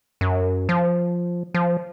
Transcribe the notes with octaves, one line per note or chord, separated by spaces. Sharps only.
F#2
F3
F3